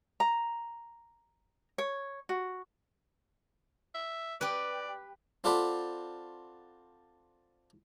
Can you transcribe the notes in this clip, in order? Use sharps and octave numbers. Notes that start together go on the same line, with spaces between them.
A#5
C#5
F#4
E5
G4 B4 D5
C4 F4 A4 D5 F#5 B5